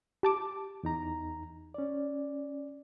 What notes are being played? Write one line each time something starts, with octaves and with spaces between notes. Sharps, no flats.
G4 A5 D6
E2 D#4 A#5
C#4 D5